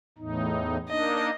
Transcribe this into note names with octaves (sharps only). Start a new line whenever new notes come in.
E2 A2 D#4
A#3 D4 D#4 D#5